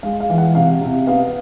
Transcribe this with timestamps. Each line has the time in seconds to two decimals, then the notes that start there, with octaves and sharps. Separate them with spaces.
0.03 G#3 F5
0.20 F5
0.30 E3
0.38 F#5
0.55 C3 F5
0.81 C3
1.07 B3 F5